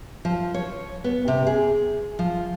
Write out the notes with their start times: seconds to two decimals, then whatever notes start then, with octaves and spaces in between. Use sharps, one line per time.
0.25 F3
0.54 C#5
1.04 B3
1.28 C3
1.47 G#4
2.19 F3